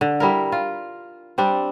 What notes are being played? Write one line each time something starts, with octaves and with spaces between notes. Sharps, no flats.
D3
G3 E4 A#4
F4
G3 C4 D4